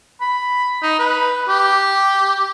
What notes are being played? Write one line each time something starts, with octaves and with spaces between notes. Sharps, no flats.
B5
D#4
B4
G4